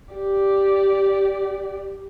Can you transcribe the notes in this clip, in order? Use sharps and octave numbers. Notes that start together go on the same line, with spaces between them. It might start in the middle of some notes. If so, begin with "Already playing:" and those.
G4 D5